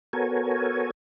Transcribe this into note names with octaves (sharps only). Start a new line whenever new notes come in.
B3 F#4 A4 A#4 C#5 G#5